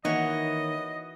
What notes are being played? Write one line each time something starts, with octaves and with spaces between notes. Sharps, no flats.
D#3 E3 A#3 D#4 F#4 C#5 D#5